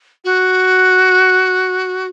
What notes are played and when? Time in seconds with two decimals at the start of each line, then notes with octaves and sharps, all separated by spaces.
0.25 F#4